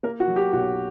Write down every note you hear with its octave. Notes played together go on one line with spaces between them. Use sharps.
A#3 A#4
F#4
F#3
G4
B1 F#4